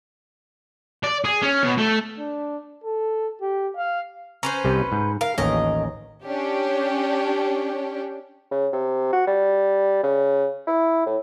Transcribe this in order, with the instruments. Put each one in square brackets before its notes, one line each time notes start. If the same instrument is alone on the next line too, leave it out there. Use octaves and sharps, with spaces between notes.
[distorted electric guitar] D5
G#4
C#4
B2
A3
[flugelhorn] D4
A4
G4
F5
[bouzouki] C#4 B4 C5 [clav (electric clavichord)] A#5
[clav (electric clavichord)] C2 C3 G3
G#2
[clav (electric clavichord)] A#4 [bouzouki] F5
[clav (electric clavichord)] A1 D#2 C#4 [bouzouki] A#4 D#5
[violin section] C#4 D4 G4
[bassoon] C#3
C3
F#4
G3
C#3
E4
A2